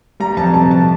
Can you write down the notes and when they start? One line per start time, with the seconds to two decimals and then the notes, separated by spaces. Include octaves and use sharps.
0.20 G3 A#5
0.37 F2 A5
0.54 C3 A5
0.71 F2 A5